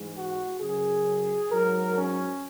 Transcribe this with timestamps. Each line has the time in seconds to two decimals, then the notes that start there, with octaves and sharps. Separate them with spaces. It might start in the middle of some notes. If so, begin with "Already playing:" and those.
Already playing: G#2 E3 G#3
0.15 F#4
0.60 F#2 C#3 F#3 G#4
1.50 G#2 F#3 A#4
1.95 C#4